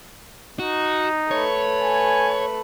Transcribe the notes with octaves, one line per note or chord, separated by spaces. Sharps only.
D#4 F#4
A3 B4 C#5
G#5